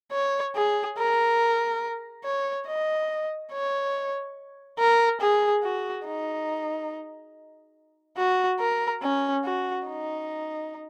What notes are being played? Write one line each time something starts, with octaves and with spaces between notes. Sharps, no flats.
C#5
G#4
A#4
C#5
D#5
C#5
A#4
G#4
F#4
D#4
F#4
A#4
C#4
F#4
D#4